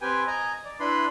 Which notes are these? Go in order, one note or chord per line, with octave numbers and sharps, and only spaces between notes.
C4 G4 B4 G5 G#5
D#5 G#5 A#5
D5
D4 E4 B4 B5 C6